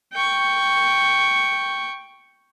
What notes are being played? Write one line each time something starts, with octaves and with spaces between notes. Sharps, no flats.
G5 C#6